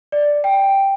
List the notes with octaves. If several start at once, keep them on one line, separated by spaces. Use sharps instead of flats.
D5
G5